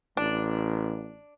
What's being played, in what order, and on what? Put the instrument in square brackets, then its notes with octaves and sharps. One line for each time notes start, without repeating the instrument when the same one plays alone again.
[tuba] A1 [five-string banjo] D4